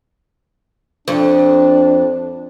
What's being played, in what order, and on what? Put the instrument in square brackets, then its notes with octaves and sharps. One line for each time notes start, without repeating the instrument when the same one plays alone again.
[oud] F2 [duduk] D4